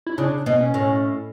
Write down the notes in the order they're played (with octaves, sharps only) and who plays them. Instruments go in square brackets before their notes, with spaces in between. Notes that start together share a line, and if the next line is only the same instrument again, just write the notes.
[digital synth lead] E4
[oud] C#3 [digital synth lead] D4
[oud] B2
[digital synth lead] C#4
[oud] A2